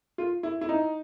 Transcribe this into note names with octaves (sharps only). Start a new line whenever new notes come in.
F4
E4
E4
D#4